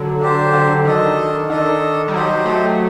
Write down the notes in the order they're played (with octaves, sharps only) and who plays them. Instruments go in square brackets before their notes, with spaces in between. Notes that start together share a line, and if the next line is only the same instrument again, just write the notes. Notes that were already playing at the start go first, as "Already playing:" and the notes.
Already playing: [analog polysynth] D3 F#3
[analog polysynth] D3 [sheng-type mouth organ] D4 G4 C5
[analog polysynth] D3
[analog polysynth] D#3 [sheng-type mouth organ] D4 A4 D#5
[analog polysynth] D#3 [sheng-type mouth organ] D4 A4 D#5
[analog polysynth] G3
[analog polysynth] F#3 [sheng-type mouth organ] G4 C5 D#5
[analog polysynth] A3